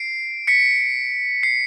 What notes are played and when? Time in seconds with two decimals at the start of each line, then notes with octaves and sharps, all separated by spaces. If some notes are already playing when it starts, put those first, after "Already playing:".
Already playing: C7 D7
0.47 B6 C#7
1.43 C7